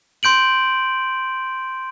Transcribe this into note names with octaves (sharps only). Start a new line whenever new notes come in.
C6 G6 D7 F#7